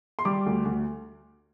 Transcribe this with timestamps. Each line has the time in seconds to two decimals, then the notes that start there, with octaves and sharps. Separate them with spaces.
0.19 C6
0.25 G3 D6
0.46 D2
0.65 D2